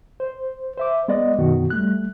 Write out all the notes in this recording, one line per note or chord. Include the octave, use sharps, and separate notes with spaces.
C5
C5 E5 D6
G#3 B3 D5 D#5
F#2 B2 D#3 B3 F#4
G3 A3 F#6